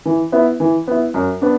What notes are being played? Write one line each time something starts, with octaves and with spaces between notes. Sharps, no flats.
E3
B3 E4
E3
B3 E4
F#2
B3 D4